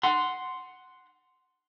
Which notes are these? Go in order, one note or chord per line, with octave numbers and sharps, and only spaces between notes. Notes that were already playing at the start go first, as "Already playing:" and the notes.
F#5 C6